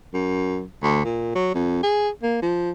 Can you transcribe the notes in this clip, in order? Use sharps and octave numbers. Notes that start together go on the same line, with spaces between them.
F#2
D2
A#2
F#3
F2
G#4
A#3
F3